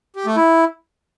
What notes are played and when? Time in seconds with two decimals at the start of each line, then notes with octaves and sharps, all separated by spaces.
0.16 G4
0.26 A3
0.36 E4